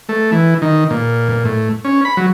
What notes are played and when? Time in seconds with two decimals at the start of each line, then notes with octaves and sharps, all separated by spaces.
0.09 A3
0.32 E3
0.62 D#3
0.90 A#2
1.29 A#2
1.45 A2
1.84 C#4
2.05 B5
2.17 F#3